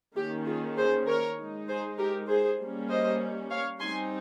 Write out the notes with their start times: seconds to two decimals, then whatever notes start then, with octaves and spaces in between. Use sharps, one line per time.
0.16 D#3 A#3 C#4 G4
0.47 F4 G#4
0.77 G#4 C5
1.07 A#4 C#5
1.38 G#3 D#4
1.68 G#4 C5
1.98 G4 A#4
2.29 G#4 C5
2.59 G3 A#3 C#4
2.90 C5 D#5
3.51 C#5 F5
3.80 G3 C4 D#4 G#5 C6